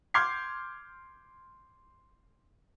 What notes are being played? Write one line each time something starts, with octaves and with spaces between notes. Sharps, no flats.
C6 D6 F6 G6 G#6 C7